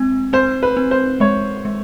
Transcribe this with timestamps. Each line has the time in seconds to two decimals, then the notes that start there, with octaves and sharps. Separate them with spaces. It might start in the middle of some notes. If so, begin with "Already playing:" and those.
Already playing: G#3 C4
0.33 C4 C5
0.63 B4
0.77 C4
0.91 C5
1.20 G#3 C#5
1.65 G#3